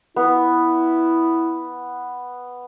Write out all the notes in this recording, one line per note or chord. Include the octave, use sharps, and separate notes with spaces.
B3 E4